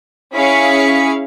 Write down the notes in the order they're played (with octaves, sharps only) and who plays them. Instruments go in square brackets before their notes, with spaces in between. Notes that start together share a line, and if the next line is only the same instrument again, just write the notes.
[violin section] C#4 E4 G#4 F5 B6 C#7